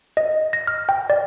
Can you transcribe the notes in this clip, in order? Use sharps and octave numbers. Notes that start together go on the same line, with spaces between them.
D#5
A#6
F6
G5
D5